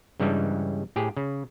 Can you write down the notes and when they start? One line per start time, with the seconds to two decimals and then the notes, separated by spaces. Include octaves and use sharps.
0.20 G2 C#3 E3 G3 G#3
0.96 A2 G4 G#4
1.17 C#3